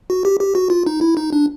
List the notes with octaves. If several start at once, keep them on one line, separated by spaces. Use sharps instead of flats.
F#4
G4
G4
F#4
F4
D#4
E4
D#4
D4